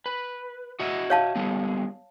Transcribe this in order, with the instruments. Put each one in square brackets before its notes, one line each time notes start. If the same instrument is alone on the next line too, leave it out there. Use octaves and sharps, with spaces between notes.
[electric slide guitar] B4
F#4 D#5 E5
[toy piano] C#5 F5 A5
[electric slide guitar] G3 G#3 B3